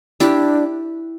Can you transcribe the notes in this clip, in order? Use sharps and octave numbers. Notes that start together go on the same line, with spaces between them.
D4 E4 G4